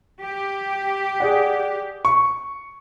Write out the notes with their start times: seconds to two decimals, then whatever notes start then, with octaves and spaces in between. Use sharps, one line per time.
0.20 G4
1.20 G#4 D5 F#5
2.05 C#6